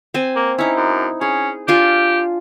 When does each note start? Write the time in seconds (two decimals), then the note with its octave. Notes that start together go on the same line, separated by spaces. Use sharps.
0.14 C4 G#5
0.36 A#3
0.58 C#4 D#4 E4
0.77 F#2
1.21 C#4 G#4
1.68 D4 F4 G4 G#5